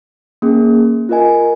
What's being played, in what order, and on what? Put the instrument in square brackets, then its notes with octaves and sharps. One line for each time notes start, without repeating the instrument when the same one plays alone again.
[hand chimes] A#3 C#4 G#4
F4 A#4 D#5 G#5